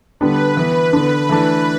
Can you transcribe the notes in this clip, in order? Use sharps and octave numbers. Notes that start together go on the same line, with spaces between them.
D3 G3 B3 D4 B4
E3 B3 E4
D3 B3 D4
E3 A3 D4